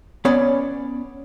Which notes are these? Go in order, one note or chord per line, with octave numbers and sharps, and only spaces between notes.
B3 C#4 C#5 D5 B5